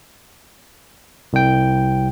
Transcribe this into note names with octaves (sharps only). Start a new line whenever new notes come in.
C2 G5